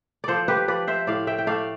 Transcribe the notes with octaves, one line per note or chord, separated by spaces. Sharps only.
F3 A4 C5 D5
G4 B4
F3 B4 D5
C5 E5
A2 D5 F5
E5 G5
G5
A3 D5 F5